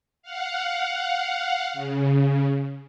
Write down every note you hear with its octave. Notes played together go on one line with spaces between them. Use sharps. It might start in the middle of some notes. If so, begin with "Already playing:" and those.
F5 F#5
C#3